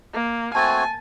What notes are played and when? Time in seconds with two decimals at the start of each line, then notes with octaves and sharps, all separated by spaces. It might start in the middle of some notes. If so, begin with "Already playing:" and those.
0.14 A#3
0.55 A3 C4 F#4 G#5 A5 A6